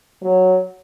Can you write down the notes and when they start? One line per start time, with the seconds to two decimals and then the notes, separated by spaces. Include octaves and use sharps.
0.23 F#3